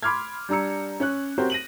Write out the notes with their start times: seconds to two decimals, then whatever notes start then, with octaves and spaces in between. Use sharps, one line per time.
0.03 B5 C6 D6 F6 G#6
0.49 G3 D4 A#5 E6 C#7
1.00 C#4 C#5 F#6
1.38 C4 F#4 G4 A#4 C5 C#5
1.50 A#6 D#7 F#7